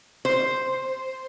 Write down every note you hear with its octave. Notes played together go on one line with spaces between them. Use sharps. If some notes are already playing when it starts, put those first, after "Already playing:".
C5